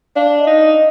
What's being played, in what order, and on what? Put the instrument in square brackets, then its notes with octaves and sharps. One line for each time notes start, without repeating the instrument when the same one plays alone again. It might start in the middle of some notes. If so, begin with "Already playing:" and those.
[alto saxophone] D4 [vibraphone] F5
[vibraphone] D#5
[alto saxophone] D#4
[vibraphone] D#5